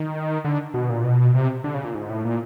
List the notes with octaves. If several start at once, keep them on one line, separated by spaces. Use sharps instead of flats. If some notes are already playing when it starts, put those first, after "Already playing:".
Already playing: D#3
D3
B2
A#2
B2
C3
D3
C#3
A#2
G#2
A2
A#2